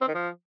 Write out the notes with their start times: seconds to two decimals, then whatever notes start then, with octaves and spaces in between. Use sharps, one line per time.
0.01 C4
0.08 D#3
0.14 F3